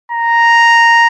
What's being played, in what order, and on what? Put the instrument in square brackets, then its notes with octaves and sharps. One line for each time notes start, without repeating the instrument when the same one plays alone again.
[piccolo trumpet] A#5